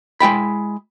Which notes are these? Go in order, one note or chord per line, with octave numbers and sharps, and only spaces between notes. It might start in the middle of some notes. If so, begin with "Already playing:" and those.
G#3 E4 G5 B5